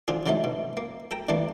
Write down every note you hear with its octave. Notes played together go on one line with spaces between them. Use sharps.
D3 F3 F4 G#4
C#3 F3 F#3 G#3 A3 D#4
B2
A#3
A4 G5 A#5
D3 E3 G3 A3 A#3